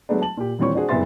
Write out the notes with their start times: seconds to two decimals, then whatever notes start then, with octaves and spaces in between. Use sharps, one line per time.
0.09 F#3 G#3 A3 B3 D4
0.22 A5 F#7
0.37 A#2 G4
0.59 D#1 E3 G3 C4 C#5 C#6
0.75 D4 F#4 G#4 C5
0.89 F#1 C2 B3 E5 C6 A6